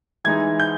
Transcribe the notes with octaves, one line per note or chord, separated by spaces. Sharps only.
E3 G#3 D#4 G#6
G6